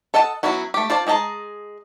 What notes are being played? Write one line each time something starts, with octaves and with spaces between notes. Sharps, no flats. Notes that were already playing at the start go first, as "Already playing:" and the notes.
A4 D#5 F#5 A5
F#3 B3 C#4 E4 F#4
A3 G4
F4 C5 D5 A5
G#3 G#4 D#5 A5 A#5